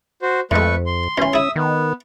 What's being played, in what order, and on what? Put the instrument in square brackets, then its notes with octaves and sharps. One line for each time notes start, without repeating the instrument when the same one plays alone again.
[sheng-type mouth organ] F#4 C5
[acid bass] F2 [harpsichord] A2 G#3 [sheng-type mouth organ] A3 B4 C#6
[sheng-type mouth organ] C6
[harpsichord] B2 E3 [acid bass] C#4
[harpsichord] E4 G#4 [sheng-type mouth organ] E5 D#6
[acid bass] D#3 [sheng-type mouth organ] B3